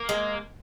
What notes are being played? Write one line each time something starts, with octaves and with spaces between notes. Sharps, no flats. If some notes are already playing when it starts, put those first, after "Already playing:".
Already playing: A#3
G#3